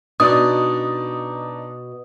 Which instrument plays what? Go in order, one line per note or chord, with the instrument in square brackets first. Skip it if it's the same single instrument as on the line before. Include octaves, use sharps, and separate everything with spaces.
[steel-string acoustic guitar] B2 [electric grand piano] D4 D#4 D5 [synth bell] D#6